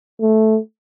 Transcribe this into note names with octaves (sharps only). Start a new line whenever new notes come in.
A3